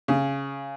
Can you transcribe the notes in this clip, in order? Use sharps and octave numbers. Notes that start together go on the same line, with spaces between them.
C#3